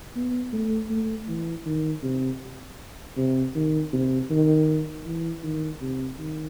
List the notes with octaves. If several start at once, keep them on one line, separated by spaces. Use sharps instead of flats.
B3
A3
A3
E3
D#3
C3
C3
D#3
C3
D#3
E3
D#3
C3
D#3